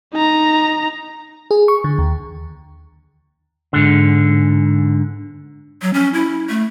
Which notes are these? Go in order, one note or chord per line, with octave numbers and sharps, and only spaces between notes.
D#4 A#5
G#4
C#6
D3
D#2
G#2 D3
F#3
C#4
E4
A3